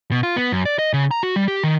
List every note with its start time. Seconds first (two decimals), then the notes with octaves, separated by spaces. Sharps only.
0.11 B2
0.23 F4
0.36 B3
0.52 F#2
0.65 D5
0.79 D#5
0.93 C#3
1.11 A#5
1.23 F#4
1.36 G3
1.48 G4
1.63 D#3